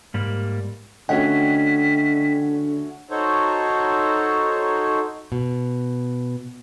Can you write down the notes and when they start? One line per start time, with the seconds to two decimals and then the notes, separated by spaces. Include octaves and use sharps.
0.14 G#2 G3 A#3
1.09 D3 A3 C#4 F#4 D#5 F#5 G5 B6
3.10 D#4 F#4 A4 C5 C#5
5.32 B2